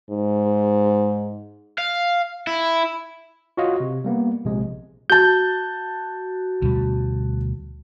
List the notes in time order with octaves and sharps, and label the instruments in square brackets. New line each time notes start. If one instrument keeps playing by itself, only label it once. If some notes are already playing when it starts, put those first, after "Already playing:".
[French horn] G#2
[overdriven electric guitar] F5
E4
[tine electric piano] F4 F#4 C#5 D#5 F5
C3
G3 A#3 B3
A#1 C3 G#3
[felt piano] F#4 A5 [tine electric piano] G6
[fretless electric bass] D2 B2 G3